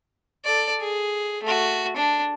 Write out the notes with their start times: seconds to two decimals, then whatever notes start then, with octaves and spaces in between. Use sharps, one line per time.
0.45 A4 D5
0.80 G#4
1.43 A3 F#4
1.96 D4